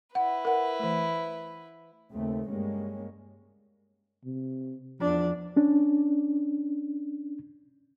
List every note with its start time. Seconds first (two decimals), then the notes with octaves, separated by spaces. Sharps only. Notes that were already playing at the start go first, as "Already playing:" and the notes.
0.15 E4 B4 F#5
0.45 A#4 F#5
0.79 E3 A3
2.11 D#2 C#3 A3 C4
2.48 G2 G3 G#3 A#3 C#4
4.24 C3
5.00 E2 F3 D4
5.56 C#4 D4